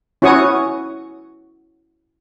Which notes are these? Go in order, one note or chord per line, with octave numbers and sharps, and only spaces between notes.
C#4 E4 F#4 C#5 C#6 D#6